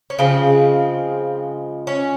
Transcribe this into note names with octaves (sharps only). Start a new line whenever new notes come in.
C#4
C#3 F3 G#3 C4
C#4